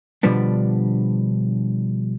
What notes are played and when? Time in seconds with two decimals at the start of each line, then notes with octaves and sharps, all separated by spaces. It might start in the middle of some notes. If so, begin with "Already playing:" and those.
0.23 B2 D3 F3 G3 B3 D4